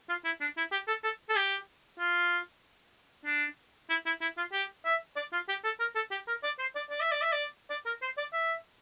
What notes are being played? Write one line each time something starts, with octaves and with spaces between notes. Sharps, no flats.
F4
E4
D4
E4
G4
A4
A4
A4
G4
F4
D4
E4
E4
E4
F4
G4
E5
D5
F4
G4
A4
A#4
A4
G4
A#4
D5
C5
D5
D5
E5
D5
E5
D5
D5
A#4
C5
D5
E5